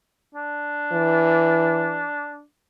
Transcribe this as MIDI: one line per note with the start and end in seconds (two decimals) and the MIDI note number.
0.35 2.42 62
0.93 2.07 52